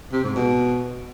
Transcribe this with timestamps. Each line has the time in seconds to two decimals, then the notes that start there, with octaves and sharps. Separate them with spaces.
0.12 C3
0.24 G#2
0.36 B2